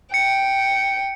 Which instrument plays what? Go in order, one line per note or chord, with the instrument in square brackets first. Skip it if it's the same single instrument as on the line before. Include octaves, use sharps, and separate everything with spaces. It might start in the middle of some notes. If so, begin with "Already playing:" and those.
[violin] G5 [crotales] C#7